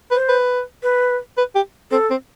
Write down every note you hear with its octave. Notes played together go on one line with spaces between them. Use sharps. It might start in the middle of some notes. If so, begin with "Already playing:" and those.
B4
C5
B4
B4
B4
G4
C4 A4
C4